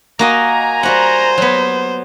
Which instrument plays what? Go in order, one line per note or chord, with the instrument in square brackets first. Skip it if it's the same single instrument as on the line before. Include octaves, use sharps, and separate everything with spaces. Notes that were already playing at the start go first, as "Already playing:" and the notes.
[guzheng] A#3 F#4 D#5 [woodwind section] G#5 A#5
[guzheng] G3 F#4 F#5 [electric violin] C5
[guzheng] F#3 B3